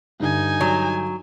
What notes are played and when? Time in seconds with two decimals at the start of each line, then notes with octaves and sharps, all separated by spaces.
0.20 G2 D3 D#4 G#5
0.61 F#3